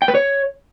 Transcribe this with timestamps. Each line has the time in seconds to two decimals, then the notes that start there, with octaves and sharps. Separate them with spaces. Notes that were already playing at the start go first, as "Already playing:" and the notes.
0.02 G5
0.08 B4
0.15 C#5